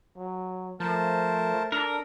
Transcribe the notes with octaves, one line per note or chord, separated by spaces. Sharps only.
F#3
F3 A3 A#4 C5 A5
D4 A4 A#4